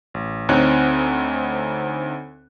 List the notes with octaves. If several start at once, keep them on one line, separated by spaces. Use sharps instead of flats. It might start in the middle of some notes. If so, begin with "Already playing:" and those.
A1
D2 C4 D#4 C#5 F#6